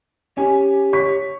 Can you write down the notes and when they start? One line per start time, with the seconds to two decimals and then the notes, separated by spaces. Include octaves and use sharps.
0.37 C#4 G4 G#5
0.93 C#5 C#6 B6